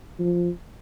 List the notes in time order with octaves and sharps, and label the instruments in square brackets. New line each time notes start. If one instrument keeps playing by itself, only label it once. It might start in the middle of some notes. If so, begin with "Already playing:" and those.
[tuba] F3